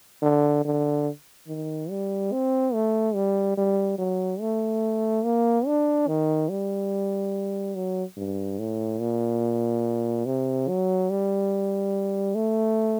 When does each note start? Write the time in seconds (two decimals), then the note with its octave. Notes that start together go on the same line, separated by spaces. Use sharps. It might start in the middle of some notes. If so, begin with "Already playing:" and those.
0.22 D3
0.65 D3
1.47 D#3
1.90 G3
2.32 C4
2.74 A3
3.15 G3
3.58 G3
3.98 F#3
4.41 A3
5.25 A#3
5.67 D4
6.07 D#3
6.49 G3
7.75 F#3
8.17 G2
8.59 A2
9.00 A#2
10.26 C3
10.68 F#3
11.10 G3
12.35 A3